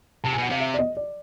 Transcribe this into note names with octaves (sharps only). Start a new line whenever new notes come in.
C3 A5
G#5
B2 F#5
C3 F5
E5
D5
D#5
D5